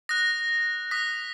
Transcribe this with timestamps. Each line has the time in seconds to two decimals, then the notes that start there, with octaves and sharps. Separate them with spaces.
0.09 D#6 F#6 A#6
0.91 D#6 F#6 B6